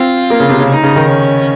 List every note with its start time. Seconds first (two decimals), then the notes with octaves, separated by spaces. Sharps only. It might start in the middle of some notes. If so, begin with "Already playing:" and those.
Already playing: C4 F4
0.30 A#3
0.40 C#3
0.49 C3
0.60 C#3
0.69 D#4
0.83 C#3
0.96 D#3
1.08 C#4